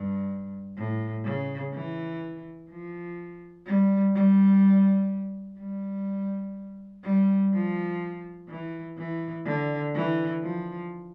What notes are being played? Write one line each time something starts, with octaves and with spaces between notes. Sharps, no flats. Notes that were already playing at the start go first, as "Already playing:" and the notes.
Already playing: G2
A2
C#3
E3
F3
G3
G3
G3
G3
F3
E3
E3
D3
E3
F3